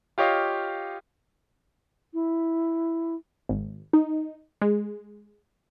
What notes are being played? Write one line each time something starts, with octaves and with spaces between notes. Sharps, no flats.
F4 G4 C#5 D#5 F5
E4
G#1
D#4
G#3